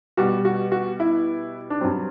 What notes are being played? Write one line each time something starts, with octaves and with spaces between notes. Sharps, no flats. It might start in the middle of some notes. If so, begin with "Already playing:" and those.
B2 G3 F#4
F#4
F#4
E4
D4
G2 F#3 C4